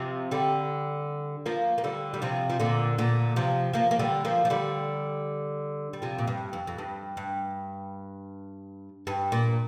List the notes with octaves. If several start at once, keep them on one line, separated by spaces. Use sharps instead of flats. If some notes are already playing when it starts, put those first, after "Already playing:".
Already playing: C3 F3
D3 G3
F3 A#3
A#3
D3 G3
G3
C3 F3
F3
A#2 D3
A#2 D3
C3 F3
F3 A#3
A#3
D3 G3
F3 A#3
F3
D3 G3
G3
C3 F3
A#2
G2
F2
F2
G2
G2
G2
A#2